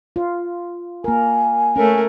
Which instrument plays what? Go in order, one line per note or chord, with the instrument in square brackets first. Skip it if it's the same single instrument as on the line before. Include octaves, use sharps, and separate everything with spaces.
[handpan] F4
[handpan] A#3 A#4 [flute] G#5
[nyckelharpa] A3 A#4 [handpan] C#4